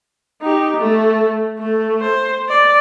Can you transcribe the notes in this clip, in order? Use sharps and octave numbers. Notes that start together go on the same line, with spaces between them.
D#4 G4
A3
A3
C5
D5